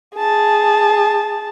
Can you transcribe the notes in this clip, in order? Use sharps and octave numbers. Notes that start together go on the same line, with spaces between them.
G#4 A5